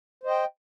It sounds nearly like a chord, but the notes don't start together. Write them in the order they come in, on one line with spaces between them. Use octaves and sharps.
C5 D#5 G5